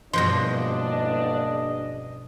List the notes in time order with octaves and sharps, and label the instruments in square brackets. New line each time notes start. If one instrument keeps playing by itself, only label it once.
[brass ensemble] F#1 D4 [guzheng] G2 B2 F3 [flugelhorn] D#5 [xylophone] C6 A#6